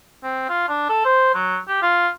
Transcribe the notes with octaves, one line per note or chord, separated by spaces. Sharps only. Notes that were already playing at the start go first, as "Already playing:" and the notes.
C4
F4
D4
A4
C5
F#3
G4
F4